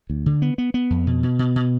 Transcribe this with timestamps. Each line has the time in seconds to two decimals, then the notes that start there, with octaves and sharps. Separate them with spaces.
0.10 D2
0.26 D3
0.42 B3
0.58 B3
0.74 B3
0.90 F2
1.07 B2
1.23 B2
1.39 B2
1.56 B2